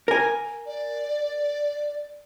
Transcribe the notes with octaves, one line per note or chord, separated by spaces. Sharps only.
A#4 G#5
D5